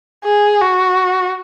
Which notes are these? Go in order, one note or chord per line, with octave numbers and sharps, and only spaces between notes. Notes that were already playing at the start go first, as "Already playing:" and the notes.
G#4
F#4